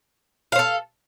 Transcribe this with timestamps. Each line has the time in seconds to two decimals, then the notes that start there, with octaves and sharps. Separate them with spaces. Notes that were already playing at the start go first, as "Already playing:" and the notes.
0.52 F5
0.56 C5
0.59 A4